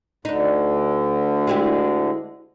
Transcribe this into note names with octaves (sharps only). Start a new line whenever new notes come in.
D2 D3 D4 D#4
G#3 E4 G4